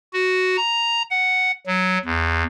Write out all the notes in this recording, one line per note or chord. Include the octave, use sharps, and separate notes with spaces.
F#4
A#5
F#5
F#3
E2